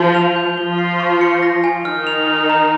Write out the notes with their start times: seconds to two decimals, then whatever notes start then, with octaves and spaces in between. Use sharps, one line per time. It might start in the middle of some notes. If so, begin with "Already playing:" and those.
Already playing: F3 F4 G6
0.14 F7
0.36 G6
0.57 F3 F4 G7
0.78 C7
1.00 C#6
1.21 C#7
1.42 A#6
1.64 G#5
1.85 D#3 D#4 F6
2.07 F7
2.28 F6
2.50 A#5